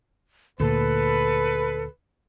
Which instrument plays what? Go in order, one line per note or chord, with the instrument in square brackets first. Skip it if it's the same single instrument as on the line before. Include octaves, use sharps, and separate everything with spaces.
[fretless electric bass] D2 A#2 [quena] A4 [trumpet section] B4